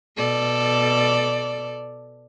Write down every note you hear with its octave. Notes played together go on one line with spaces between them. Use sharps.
B2 A4 D5